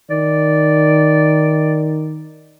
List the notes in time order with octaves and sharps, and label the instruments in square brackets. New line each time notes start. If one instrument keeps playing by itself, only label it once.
[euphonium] D#3 [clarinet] D5